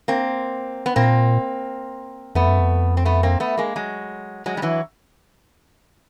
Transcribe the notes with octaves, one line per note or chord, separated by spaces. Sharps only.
A#3 C4
B3
A#2 A#3 C4
F2 A3 B3
F#2
F2
C4
A3 B3
A#3 C4
A3 B3
G#3 A#3
F#3 G#3
F#3 G#3
G3
E3 F#3